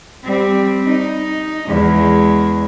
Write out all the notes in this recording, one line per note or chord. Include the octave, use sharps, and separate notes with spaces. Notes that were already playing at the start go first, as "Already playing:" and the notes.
G3 C4
D#4
E2 G#3